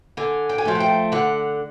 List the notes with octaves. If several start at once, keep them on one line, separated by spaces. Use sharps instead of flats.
D3 G#5
G5
G#5
F3 A3 G5
F#5
G5
D3 F#5